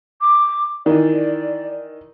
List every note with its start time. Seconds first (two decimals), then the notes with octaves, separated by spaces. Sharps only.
0.21 D6
0.86 D#3 E3 D5